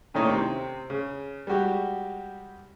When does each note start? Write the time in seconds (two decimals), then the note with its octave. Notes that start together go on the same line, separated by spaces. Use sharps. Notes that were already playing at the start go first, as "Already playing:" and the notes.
0.14 A#2 D#3 A3 C#4 D#4 E4
0.29 C3 C4
0.90 C#3
1.47 G3 G#3 F#4 G4